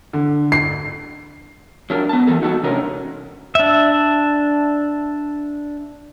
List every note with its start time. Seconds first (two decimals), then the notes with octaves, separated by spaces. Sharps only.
0.13 D3
0.52 C7
1.90 F#3 D4 A#4
2.09 B3 A5
2.27 E3 G3 A#3 A4
2.41 D#4 F#4 A4 A5
2.63 C3 C#4 D4 A#4
3.55 D4 E5